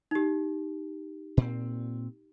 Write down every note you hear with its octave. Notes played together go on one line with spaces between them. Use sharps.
D#4 G4
A#2 C4